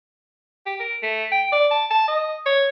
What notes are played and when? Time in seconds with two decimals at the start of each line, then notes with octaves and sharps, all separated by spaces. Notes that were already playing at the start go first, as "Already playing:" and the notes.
0.66 G4
0.80 A#4
1.03 A3
1.32 G5
1.52 D5
1.71 A5
1.91 A5
2.08 D#5
2.46 C#5